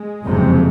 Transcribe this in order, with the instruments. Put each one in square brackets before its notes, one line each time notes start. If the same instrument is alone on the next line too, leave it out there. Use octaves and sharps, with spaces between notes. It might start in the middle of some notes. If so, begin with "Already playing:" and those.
Already playing: [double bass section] G#3
F#1 F2 C3